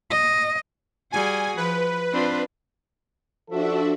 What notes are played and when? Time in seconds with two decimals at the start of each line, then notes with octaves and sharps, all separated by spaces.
0.10 D#5
1.12 G3 F#4 G#4 G#5
1.57 F3 B4
2.13 C4 D4 F4
3.50 F3 D4 F#4 A4 E5